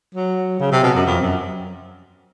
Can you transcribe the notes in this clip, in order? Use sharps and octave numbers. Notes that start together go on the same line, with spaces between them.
F#3
C#3
C3
B2
F#2
F2
F#2